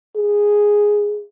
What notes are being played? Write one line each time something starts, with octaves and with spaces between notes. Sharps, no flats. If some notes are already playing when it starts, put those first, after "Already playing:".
G#4